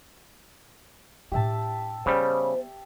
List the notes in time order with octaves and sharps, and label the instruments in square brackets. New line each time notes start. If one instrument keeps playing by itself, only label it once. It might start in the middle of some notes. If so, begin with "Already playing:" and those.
[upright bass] A2 D4 [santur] G4 E5 A5
[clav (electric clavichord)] C#3 G3 [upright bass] B3 [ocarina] C5